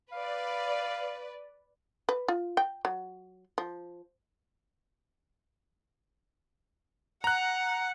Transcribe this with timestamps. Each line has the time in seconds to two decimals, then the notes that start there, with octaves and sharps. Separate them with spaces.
0.12 B4 D5 F5
2.09 B4
2.28 F4
2.57 G5
2.85 F#3
3.58 F3
7.24 F#5 A#5 F#6